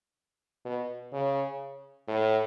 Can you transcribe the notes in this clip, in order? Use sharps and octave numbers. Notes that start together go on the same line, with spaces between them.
B2
C#3
A2